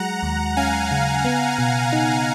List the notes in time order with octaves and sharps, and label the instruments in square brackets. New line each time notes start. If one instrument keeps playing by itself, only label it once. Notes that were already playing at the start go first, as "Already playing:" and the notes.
Already playing: [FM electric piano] F#3 G#3 [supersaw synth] F#5 A#5
[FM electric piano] D#2
[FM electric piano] C#4 [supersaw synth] F5 G#5
[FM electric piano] C#3
B3
B2
D#4